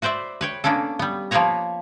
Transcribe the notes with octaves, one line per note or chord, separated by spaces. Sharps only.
F#4 B4 C5 D5 E5
B4 C#5 G5
A#3 B3 C#4 D4 A4
G3 B3
F3 A#3 B3 B4 C#5 A#5